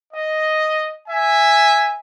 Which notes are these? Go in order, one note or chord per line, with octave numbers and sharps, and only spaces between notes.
D#5
E5 G#5